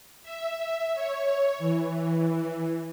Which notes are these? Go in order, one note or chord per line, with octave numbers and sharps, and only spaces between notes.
E5
C#5
E3